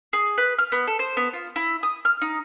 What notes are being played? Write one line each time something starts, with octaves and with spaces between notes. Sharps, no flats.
G#4
B4
F6
B3
A4
C5
B3
F4
E4
D#6
F6
D#4